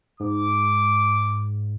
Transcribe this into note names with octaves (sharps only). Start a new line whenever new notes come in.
G#2 D6